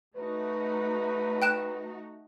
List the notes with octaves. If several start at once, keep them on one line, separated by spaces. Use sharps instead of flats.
A3 D#4 F#4 B4
G5 F#6 E7